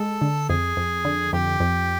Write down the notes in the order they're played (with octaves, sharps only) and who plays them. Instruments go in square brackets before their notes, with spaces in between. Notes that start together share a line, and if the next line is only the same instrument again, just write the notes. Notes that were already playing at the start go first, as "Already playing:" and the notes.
Already playing: [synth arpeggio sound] G#3 [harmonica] A4
[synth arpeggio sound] D3
[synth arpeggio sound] F2 [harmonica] G#4
[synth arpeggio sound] F2
D3
[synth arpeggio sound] F2 [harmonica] G4
[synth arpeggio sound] F2